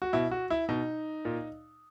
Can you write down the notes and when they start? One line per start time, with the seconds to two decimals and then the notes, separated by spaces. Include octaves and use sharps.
0.02 F#4
0.13 B2 E4
0.31 F#4
0.50 E4
0.69 B2 D#4
1.25 A#2